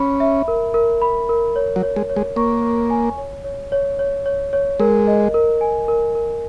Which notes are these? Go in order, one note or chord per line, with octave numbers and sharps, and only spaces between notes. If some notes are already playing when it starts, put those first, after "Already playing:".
Already playing: C#4 B5
E5
A#4
A#4
B5
A#4
C#5
F#3
C#5
G#3
C#5
G#3
A#3 C#6
C#6
G#5
C#5
C#5
C#5
C#5
C#5
C#5
G#3 A#4
D#5
A#4
G#5
A#4
A#4